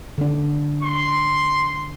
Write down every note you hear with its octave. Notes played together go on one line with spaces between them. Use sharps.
D3 D4
C6